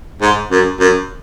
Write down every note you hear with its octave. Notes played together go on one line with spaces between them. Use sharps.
G#2
F#2
F#2